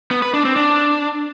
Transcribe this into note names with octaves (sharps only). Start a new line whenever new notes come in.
B3
B4
D4
C4
D4